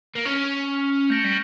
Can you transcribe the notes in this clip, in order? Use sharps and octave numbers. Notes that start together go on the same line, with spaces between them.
A#3
C#4 C#6 F6 C#7 F7
A3 G6 A#6 D7
G3